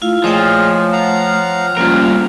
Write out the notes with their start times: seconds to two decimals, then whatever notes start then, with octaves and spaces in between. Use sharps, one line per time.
0.02 A3 E4 F4 F5
0.24 A#2 F3 A3 G#4 C5 C#5 D#5 G5
0.92 F5 F#5 A#5
1.77 D2 G2 C3 A#3 C#4 F4 A#4 C5